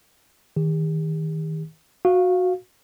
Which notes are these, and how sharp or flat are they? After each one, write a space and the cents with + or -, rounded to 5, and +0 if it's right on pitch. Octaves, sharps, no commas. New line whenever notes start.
D#3 +25 G4 +45
F#4 -15 F5 +0